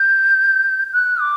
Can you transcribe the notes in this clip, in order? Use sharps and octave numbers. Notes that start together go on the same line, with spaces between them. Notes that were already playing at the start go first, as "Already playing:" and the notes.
Already playing: G6
F#6
D6